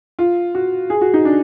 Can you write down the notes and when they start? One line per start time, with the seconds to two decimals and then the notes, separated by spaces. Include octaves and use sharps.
0.19 F4
0.55 F#4
0.90 G#4
1.01 F#4
1.14 D#4
1.25 D4